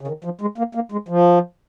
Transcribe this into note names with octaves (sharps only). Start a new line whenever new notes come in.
C#3
D#3
F3
G#3
A#3
A#3
G#3
F3